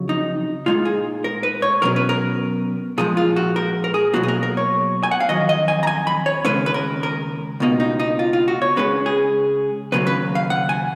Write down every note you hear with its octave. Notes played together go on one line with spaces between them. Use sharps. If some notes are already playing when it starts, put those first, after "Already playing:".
Already playing: F2 C#3 F#3
D#4
A#2 G#3 D#4 F4
G#4
A#4
B4
C#5
B2 F#3 C#4 A#4
B4
A#4
A#2 F3 G#3 G#4
F4
F#4
A#4
A#4
G#4
B2 F#3 A#3 F#4
G#4
A#4
A#4
C#5
G#5
F#5
F5
F2 D#3 F#3 D#5
D#5
G#5
A#5
G#5
B5
C#5
D#2 C#3 G#3 C#4 B4
B4
A#4
A#4
C#2 B2 A#3 D#4
D#4
D#4
F4
F4
F#4
C#5
C#3 G#3 C#4 B4
G#4
D#2 C#3 F#3 A#3 B4
B4
F5
F#5
G#5